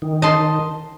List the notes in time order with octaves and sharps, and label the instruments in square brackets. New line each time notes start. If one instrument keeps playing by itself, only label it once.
[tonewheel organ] D#3
[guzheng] D#5 A5 C6